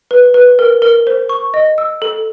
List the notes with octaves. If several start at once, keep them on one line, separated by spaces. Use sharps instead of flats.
B4
B4
A#4
A#4
C5
C#6
D#5
E6
A4